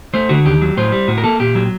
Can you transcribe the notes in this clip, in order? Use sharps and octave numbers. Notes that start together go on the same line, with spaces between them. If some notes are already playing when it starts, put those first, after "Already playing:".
A3 C5
D3 F#4
D#2 G4
F#3
A2 C5
G3
A2 F#4
A#4
A#3 A4
A#2 G4
F#3